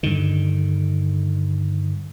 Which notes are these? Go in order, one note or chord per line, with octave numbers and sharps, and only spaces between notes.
G2 D3 D#3